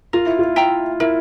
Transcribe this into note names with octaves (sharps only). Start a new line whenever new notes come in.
F4 A#4
E4
F4
E5 G5 A#5
E4 A#4